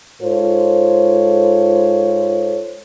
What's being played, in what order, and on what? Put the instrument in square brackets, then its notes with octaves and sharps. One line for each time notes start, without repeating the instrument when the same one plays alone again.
[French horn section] G#2 F4 A4 C5 C#5